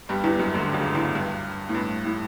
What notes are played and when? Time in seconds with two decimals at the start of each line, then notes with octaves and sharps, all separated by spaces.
0.09 G2 G3
0.24 E2 E3
0.39 F#2 F#3
0.54 D2 D3
0.74 C#2 C#3
0.95 E2 E3
1.15 G2
1.69 A2
1.75 G2
2.05 A2